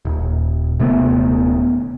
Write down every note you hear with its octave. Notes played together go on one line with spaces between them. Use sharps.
D#1
D#1 C3 A3 B3